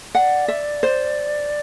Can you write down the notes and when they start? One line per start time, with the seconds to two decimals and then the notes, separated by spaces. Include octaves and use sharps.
0.15 D5 F#5
0.48 E5
0.83 C5